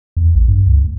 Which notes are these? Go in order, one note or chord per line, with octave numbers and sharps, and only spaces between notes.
E2
A1
G2
C#2
D2